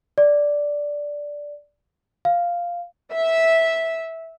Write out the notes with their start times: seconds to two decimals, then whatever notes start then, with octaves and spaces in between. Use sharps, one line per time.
0.18 D5
2.25 F5
3.12 E5